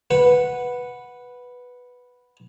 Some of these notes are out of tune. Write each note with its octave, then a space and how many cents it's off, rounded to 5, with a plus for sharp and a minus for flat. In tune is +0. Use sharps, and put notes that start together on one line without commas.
B4 +0 F#5 -10